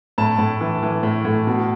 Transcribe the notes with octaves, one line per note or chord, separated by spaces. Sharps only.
A2 A5
A2
E3
E3
A2
A2
B2